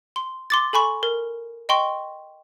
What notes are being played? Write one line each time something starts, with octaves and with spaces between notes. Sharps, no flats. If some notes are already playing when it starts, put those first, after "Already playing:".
C6
C6 D6 A6
A4 G#5 B5 C#6
A#4
D#5 G5 C6 C#6